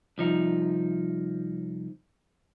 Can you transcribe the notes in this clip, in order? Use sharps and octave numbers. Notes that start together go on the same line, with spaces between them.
C2 F3 D#4